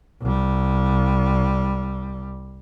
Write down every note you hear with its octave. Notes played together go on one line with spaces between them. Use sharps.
C2 G3